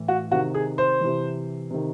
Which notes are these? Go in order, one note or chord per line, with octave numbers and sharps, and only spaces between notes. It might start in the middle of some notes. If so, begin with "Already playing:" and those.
Already playing: A2 E3
F#4
C3 D#3 F#4
G#4
C5
C3 E3
C3 D#3